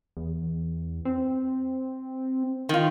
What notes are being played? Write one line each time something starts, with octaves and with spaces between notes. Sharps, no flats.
E2
C4
D#3 F4